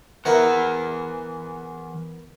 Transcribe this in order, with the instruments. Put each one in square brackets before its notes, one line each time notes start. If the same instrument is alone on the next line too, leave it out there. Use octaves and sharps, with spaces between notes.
[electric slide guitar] E3 F#5 [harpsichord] B3 E4 A#4